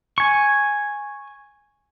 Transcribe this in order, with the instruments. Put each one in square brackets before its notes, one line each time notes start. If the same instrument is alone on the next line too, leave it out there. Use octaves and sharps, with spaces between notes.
[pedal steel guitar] G#5 C#6